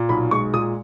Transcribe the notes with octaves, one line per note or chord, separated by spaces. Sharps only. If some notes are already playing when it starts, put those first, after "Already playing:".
Already playing: A#2
B1 B5
G#3 C#6
A#2 D#6